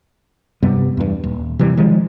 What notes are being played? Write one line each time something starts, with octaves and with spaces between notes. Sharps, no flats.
G2 C3 G3 B3
E2 G2
D#1
C3 E3 G3
D#3 F3 G#3